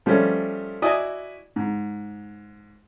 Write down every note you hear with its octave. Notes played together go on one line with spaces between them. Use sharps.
F3 G3 A3 C#4 A4
E4 F#4 D5 D#5 G#5 D#6
G#2